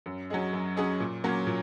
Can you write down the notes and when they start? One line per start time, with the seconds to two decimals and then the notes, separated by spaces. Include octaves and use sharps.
0.06 F#2
0.30 F#3 C#4 G#4 D#5
0.53 F#2
0.77 F#3 C#4 G#4 D#5
1.00 A#2
1.24 F#3 A#3 C#4
1.47 A#2